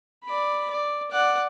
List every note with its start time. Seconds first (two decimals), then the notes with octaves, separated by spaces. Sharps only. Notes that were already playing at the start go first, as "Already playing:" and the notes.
0.24 D5 B5
0.70 D5
1.11 D5 F#5